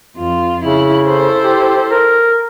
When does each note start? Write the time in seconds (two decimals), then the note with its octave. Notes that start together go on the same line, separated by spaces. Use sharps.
0.17 F2 F4
0.64 C#3 E4
1.03 E4 A4 C5
1.44 G4
1.91 A#4